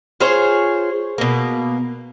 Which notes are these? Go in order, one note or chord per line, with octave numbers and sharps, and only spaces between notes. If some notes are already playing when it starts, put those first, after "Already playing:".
F4 G#4 C5 C#5
B2 A#3